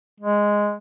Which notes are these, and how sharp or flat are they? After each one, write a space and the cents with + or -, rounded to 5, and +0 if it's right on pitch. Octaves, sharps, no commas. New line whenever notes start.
G#3 -5